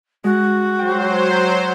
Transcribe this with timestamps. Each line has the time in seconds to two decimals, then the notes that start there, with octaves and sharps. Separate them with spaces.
0.24 G#3 F#4
0.79 F#3 C5 G5